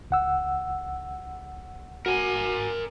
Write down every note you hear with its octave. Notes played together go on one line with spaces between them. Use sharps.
C#2 F#5 E6
F#4 A#4 G#5